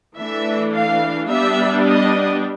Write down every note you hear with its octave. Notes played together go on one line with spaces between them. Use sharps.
E3 A3 D4 E5
F5
G3 B3 D4 E5
D#5